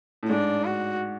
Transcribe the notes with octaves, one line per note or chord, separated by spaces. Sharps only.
A2
G#2 D4
F#4